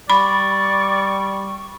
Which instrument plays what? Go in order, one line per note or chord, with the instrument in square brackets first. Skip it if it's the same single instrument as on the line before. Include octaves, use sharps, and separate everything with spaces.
[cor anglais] G3 [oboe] D5 [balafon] B5 [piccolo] C#6